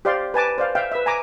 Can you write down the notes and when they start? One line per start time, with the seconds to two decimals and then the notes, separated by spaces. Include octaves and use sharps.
0.05 G4 C5 D5 F5 C6
0.34 B4 G#5 A5 D6
0.58 C5 D5 F5
0.75 E5 F5 G5
0.92 B4 E5
1.06 G#5 A#5 D6